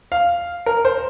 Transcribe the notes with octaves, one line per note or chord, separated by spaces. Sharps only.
F5
A#4
C5